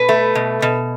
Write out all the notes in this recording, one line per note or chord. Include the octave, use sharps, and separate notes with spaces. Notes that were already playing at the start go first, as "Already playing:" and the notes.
Already playing: B2 B4
A3
B2
B2